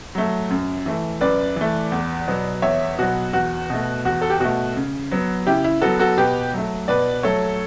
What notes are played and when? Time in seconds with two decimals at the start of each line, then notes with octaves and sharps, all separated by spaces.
0.15 F#3 A3
0.50 F#2
0.86 E3 A3
1.21 F#2 B4 D5
1.56 E3 A3
1.92 E2
2.27 B2 F#3 B3
2.62 E2 C#5 E5
2.99 B2 F#3 B3 F#4
3.33 E2 F#4
3.70 B2 A3
4.05 E2 F#4
4.21 A4
4.30 G4
4.40 B2 A3 F#4
4.76 C#3
5.11 F#3 B3
5.47 C#3 E4 G4
5.64 E4
5.81 F#3 B3 F#4 A4
5.99 F#4 A4
6.18 B2 G4 B4
6.53 F#3 A3
6.88 B2 B4 D5
7.23 F#3 A3 A4 C#5